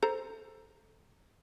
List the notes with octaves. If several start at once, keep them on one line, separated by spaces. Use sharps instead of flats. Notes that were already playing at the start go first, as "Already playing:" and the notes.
A4 C5 A#5